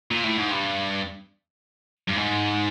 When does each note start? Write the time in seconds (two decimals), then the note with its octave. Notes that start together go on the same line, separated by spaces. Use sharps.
0.11 A#2
0.24 A2
0.37 G#2
0.50 G2
2.08 G2
2.16 G#2